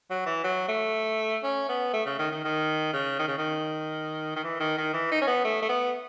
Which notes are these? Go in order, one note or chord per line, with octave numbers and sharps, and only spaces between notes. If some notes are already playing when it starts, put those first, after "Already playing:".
F#3
E3
F#3
A3
C#4
B3
A3
C#3
D#3
D#3
D#3
C#3
D#3
C#3
D#3
D#3
E3
D#3
D#3
E3
D#4
C#4
B3
A3
A3
B3